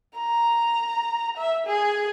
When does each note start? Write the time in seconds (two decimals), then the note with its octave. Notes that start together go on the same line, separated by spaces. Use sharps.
0.18 A#5
1.37 E5
1.66 G#4